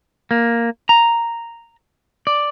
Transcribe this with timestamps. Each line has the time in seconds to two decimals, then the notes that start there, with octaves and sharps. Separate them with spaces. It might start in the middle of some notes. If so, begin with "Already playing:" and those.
0.31 A#3
0.89 A#5
2.27 D5